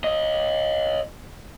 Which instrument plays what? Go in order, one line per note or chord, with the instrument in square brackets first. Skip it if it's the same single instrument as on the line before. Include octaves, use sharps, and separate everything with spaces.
[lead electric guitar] C#5 D#5